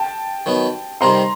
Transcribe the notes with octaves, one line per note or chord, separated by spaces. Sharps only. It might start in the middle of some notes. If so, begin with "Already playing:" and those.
Already playing: G5 A5
D#3 F#3 B3
C3 D#3 G3 C4 A#5 C6